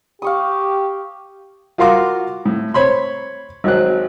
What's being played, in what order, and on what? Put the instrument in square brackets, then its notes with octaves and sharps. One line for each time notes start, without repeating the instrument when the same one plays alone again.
[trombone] G4 [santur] F5 C#6 D#6
[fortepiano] F4 F#4 A#4 F5 C6 D6
A2
C5 C#5 B5 C6
G#1 F#3 C4 F#6